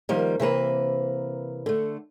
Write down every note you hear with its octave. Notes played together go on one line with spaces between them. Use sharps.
D#3 F3 G3 A#3
C3 E3 A#3 B4
D3 A3